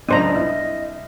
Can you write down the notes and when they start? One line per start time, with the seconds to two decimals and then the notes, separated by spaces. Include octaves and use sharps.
0.09 C#2 F#2 D4 C5 D#5 A#5
0.35 C2